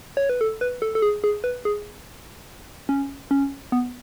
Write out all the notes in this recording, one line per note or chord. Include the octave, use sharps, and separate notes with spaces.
C#5
B4
A4
B4
A4
A4
G#4
G#4
B4
G#4
C#4
C#4
B3